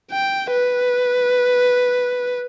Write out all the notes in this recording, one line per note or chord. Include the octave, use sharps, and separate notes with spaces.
G5
B4